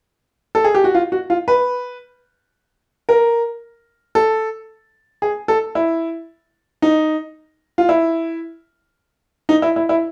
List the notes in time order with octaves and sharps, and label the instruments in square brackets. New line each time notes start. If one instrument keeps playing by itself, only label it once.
[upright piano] A4
G#4
G4
F#4
F4
F#4
F4
B4
A#4
A4
G#4
A4
E4
D#4
F4
E4
D#4
E4
E4
E4